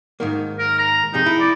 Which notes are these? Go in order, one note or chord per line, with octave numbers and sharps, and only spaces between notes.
G#2 D#3 A#3
A#4
A#5
F2 C3 D#4 G#4
E4
D5